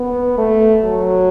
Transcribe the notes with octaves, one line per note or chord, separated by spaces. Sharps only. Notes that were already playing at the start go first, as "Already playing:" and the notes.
Already playing: B3
A3
F#3